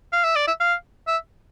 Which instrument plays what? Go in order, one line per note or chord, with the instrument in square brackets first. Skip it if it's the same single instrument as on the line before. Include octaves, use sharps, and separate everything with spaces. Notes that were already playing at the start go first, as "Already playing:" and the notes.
[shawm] F5
E5
D5
E5
F5
E5